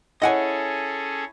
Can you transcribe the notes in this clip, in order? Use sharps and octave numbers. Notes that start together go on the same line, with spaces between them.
C#4 E4 G#4 A4 C#5 D#5 F#5 G#5